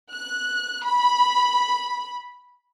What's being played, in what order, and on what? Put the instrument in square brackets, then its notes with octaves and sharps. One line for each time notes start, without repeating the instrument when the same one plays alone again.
[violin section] F#6
B5